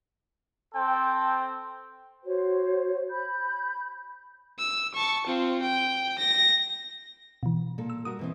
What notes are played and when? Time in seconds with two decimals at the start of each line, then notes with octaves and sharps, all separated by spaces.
0.74 C4 A4 G5
2.24 F#4 C5 C#5
3.09 B5 G6
4.58 E6
4.94 A5 C#6
5.27 C4 F4
5.63 G5
6.19 A#6
7.43 B2 E3
7.78 A#2 A4
7.90 E6
8.05 G3 F#4 A#4 D#6
8.19 B2 E3 C4